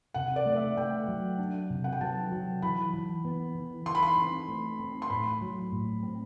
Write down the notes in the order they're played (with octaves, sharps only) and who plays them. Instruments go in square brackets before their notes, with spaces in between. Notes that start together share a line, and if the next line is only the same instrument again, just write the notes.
[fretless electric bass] C3 [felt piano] F#5
[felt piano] D5
[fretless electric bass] A3
[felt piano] D5
E5
[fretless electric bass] A3 [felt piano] G5
[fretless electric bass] F#3
D4
C3
[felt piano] F#5
G5
[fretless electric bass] F#3 [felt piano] A5
[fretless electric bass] F#3
[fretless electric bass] E3 [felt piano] B5
[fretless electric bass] E3
B3
E3
[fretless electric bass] E3 [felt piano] C6
[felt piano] B5
C6
[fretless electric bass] C4
A3
C4
[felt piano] C6
[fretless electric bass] A2 [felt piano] B5
[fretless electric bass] F#3
A2
C4